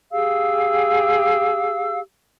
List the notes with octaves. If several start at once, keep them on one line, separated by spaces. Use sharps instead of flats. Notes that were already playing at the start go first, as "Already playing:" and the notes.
G4 G#4 F5 E6